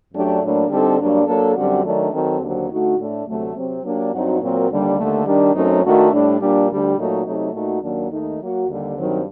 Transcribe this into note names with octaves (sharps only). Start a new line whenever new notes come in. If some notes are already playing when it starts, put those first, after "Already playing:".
F#2 F#3 A3 D4 G4
A2 F#3 A#3 D4
D3 G3 C4 D#4 A4
G2 F#3 A#3 D4
F#3 A#3 D4 A4
F#2 D3 G3 C4 F#4
D#3 F#3 A3 D4
D#3 F#3 C4 F#4 A4
D#2 D3 F#3 C4
D3 A3 D#4 F#4
A2 A3 D4
D2 C3 F#3 A3
C3 F#3 C4
F#3 A#3 D4 G4
G2 F#3 C4 D#4 F#4
A#2 F#3 C4 F#4 A#4
D#2 D3 G3
D#2 D3 A3
D#3 G3 D4
F#2 F#3 A3 C4 D#4
D#3 A3 D4 F#4
A2 G3 D4
A#2 G3 D4
D2 D3 G3 D4 G4
A#2 F#3 A3 D#4 F#4
C3 F#3 A3 D#4
A#2 A3 D#4 F#4
D#2 D#3 F#3 A#3 D4
D#2 D#3 A3 D#4
F#3 A#3 F#4
D#2 D3 G3
G2 D#3 F#3 C4